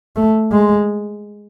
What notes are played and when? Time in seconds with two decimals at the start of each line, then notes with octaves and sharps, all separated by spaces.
0.16 A3
0.52 G#3